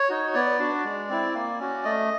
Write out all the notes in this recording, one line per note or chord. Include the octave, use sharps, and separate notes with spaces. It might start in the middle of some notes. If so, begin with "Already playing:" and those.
Already playing: C#5
D#4 F#4
B3 D5
D4 F#4
G#3
C4 E4
A#3
C#4 F#4
A3 D#5